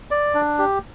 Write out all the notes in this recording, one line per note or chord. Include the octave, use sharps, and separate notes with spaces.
D5
D4
G4